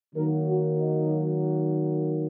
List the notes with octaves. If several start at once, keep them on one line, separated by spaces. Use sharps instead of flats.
D#3 F#3 A#3 A#4
F#4
D#4